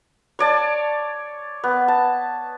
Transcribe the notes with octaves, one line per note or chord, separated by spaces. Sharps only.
C#5 D5 A5
B3
A5